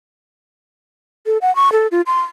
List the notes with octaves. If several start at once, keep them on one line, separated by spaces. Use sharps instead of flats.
A4
F#5
C#6
A4
F4
C6